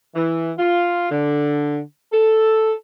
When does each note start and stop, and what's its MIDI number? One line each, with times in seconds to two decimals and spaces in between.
0.15 0.51 52
0.58 1.07 65
1.11 1.78 50
2.12 2.73 69